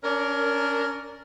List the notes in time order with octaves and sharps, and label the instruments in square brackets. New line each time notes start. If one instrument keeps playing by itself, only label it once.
[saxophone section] C#4 D4 A#4